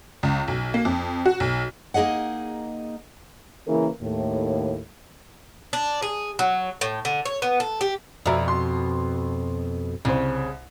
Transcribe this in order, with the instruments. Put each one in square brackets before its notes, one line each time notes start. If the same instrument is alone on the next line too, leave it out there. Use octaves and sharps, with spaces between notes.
[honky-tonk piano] C#2
B1
A#3
F2
F#4
B1
[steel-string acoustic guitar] A#3 D#4 G#4 D#5 F#5
[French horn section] C#3 E3 A#3 A#4
D#2 A2
[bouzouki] D4
G#4
F#3
A2
D3
C#5
B3
A4
G4
[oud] F2 B2 [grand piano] D5 E5 A#5
[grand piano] C6
[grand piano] C2 C5 [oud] C#3